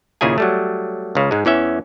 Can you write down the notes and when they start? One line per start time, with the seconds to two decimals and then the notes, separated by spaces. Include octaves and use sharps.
0.21 D#2 A#2 C#3 E4 G#4 G#5
0.38 F#3 G3 A3
1.15 C#2 C#3
1.31 G#2 G#3
1.45 E2 E3 C#4 E5